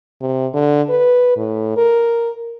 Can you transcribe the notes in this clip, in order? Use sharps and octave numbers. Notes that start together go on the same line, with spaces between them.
C3
D3
B4
A2
A#4